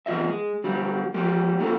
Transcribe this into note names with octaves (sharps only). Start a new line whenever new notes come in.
E2 G#2 F4 D#5 E5
G#3
D3 F#3 G3
F3 G#3 G4
A#3 C#4 D#4 F4 G#4 A4